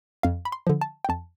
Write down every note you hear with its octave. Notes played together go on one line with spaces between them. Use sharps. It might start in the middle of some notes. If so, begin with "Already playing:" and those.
F2 F5
B5
C6
D3 F3
A5
G5
F2 A5